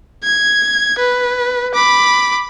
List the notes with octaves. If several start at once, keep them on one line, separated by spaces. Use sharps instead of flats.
G#6
B4
B5 D6